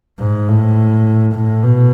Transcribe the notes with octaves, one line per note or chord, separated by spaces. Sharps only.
G#2
A2
A2
B2